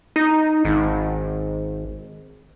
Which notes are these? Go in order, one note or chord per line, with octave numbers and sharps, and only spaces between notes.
D#4
G#1